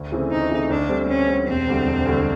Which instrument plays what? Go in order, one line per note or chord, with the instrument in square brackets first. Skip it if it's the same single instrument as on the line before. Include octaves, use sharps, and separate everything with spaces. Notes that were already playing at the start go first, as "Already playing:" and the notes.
Already playing: [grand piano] D2
C#3 E3 A3 C4
[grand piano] D2 [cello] D#4
[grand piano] C#3 E3 A3 C4
[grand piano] D2 [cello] D4
[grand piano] D3 G3 C4
[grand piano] D2 [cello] C#4
[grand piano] D3 G3 C4
[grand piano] E1 [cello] C4
[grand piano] D2 D3 G3
E1
D2 D3 G3